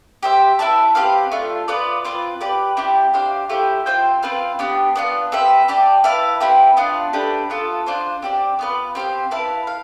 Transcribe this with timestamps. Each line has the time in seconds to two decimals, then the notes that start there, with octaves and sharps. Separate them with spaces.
0.23 G4 C5 E5
0.59 E4 B4 E5 A5
0.95 C4 G4 B4 F5
1.31 A3 D4 F4
1.68 B3 F4 B4 D5
2.04 C4 F4 B4
2.41 G4 B4 D5
2.77 C4 E4 G4 D5
3.13 D4 G4 C5 F5
3.49 A3 E4 G4 C5
3.86 C4 F4 C5 G5
4.22 C4 F4 B4 F5
4.59 B3 D4 G4
4.96 B3 D4 F4
5.32 C4 G4 B4 E5
5.68 G4 D5 A5
6.04 E4 B4 F5 A5
6.40 C4 E4 G4 B4
6.77 B3 D4 F4
7.13 A3 D4 G4 B4
7.50 B3 F4 A4
7.86 D4 F4 C5
8.22 C4 G4 D5
8.59 B3 F4 B4
8.95 C4 G4 C5 F5
9.31 E4 B4 F5 A5
9.67 F5